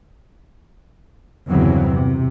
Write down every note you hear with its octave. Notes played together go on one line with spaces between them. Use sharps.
G1 E2 C#3 E3 F#3 C4
C3